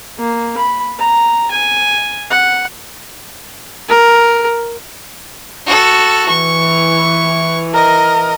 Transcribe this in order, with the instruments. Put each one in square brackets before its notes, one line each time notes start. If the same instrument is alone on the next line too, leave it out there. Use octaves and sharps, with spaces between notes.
[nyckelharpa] A#3
B5
A#5
G#5
F#5
A#4
[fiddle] F#4 A4
[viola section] E3 [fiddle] C#6
[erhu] A#4 [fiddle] D#5